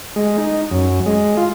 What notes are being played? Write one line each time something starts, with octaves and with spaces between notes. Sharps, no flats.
G#3
D#4
F#2
G#3
F4